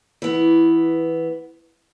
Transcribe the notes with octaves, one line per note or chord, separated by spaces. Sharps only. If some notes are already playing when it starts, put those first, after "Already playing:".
E3 B3